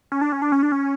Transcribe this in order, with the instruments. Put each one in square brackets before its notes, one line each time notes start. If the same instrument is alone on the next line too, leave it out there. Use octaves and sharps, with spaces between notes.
[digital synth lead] C#4
D4
C#4
D4
C#4
D4
C#4